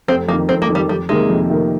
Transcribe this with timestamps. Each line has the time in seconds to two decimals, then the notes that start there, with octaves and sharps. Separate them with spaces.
0.08 F1 C4
0.28 F2 A#3
0.33 D#3
0.49 F1 C4
0.62 A#3
0.69 F2 D#3
0.75 G3
0.88 F2 G3
1.09 C3 D#3 G#3 A#3
1.30 F2
1.50 C3 D#3 A#3